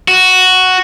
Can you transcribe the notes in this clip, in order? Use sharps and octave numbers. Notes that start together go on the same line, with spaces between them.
F#4